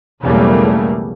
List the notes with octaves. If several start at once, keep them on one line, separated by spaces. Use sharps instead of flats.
B1 E2 C#3 G3 A3 A#3